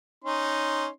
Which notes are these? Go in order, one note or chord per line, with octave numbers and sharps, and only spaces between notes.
C#4 D#4 C6